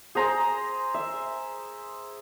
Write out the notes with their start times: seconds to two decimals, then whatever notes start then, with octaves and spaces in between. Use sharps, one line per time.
0.15 G#4 C5 A#5
0.94 E5